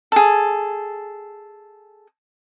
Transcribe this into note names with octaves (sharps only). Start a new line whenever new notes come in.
G#4 A4